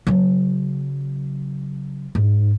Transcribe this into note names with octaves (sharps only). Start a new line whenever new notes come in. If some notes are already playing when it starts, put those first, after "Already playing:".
C#3 F#3
G#2